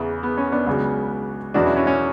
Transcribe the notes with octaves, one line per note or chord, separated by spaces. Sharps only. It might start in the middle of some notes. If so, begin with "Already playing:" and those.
Already playing: E2 C#3 E3
B3
C#4
B3 D4
C#2 C#3 F#3
E2 B2 F#3 D4 F#4
C#4 E4
C#4 E4
C#4